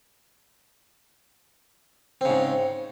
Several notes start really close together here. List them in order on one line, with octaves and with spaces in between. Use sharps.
C4 C#3 G#2